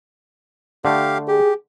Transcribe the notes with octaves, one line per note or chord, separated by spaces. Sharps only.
D3 A3 G4 F5
G4 G#4